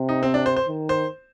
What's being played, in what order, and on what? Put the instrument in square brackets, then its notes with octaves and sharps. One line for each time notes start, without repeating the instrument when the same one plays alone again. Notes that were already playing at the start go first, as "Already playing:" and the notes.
Already playing: [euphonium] C3
[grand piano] D#4
C4
D4
C5
C5
[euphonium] D#3
[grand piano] C5